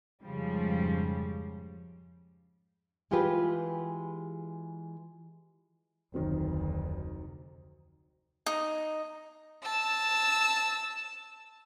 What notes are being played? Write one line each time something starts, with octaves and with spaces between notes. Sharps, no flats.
F2 G#2 C#3 F3 G3
E3 G#3 F4 G4 G#4 B4
F1 D2 D#3 F#3 C4
D#4
A5 E6